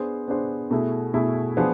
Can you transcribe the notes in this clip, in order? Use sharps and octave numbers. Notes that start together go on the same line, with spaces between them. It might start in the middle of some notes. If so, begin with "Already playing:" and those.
Already playing: B3 D4 G#4 C5
B3 D4 G#4 C5
B2 A3 E4 G#4
B2 A3 E4 G#4
F3 B3 D4 G#4 C5